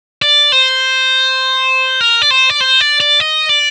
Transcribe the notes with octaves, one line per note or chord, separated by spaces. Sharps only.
D5
C5
A#4
D5
C5
D5
C5
D5
D5
D#5
D5